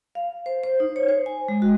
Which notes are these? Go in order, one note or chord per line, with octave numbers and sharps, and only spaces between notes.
F5
C5
C5
D#4
C#5
C5
G#5
G#3
F#4